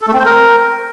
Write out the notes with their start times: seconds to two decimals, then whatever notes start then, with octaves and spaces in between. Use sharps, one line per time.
0.02 A4
0.08 A3
0.13 C4
0.19 C5
0.25 A#4